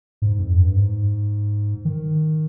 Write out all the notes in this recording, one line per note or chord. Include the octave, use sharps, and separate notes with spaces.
G#2
F2
G2
G#2
D#3